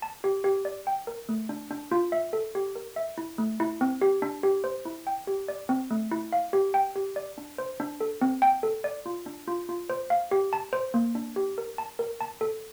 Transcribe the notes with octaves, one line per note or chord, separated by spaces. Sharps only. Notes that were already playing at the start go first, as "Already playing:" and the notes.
A5
G4
G4
D5
G5
A#4
A3
D4
D4
F4
E5
A4
G4
A#4
E5
E4
A3
E4
C4
G4
D4
G4
C5
E4
G5
G4
D5
C4
A3
E4
F5
G4
G5
G4
D5
D4
C5
D4
A4
C4
G5
A4
D5
F4
D4
F4
F4
C5
F5
G4
A5
C5
A#3
D4
G4
A#4
A5
A#4
A5
A4